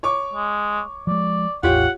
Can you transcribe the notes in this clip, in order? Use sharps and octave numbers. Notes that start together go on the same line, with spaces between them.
C#5 C#6 D6
G#3
F3 G#3 D5
A1 E2 F4 G4 C#5 F#5